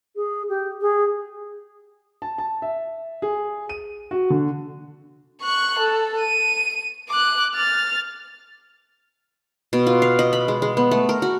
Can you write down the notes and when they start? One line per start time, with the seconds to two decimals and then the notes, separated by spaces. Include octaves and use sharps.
0.16 G#4
0.49 G4
0.81 G#4
2.22 A5
2.38 A5
2.62 E5
3.22 G#4
3.69 D#7
4.11 F#4
4.30 D3
5.42 C#6 F#6
5.79 A4
6.21 D#7
7.09 D6 F#6
7.54 F6 A6
9.73 B2
9.87 F4
10.02 F5
10.19 D#5
10.33 B5
10.48 G#3
10.62 G#3
10.77 B3
10.91 A3
11.09 A#4
11.22 F#4